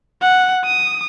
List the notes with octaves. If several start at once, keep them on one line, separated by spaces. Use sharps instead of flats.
F#5
D#6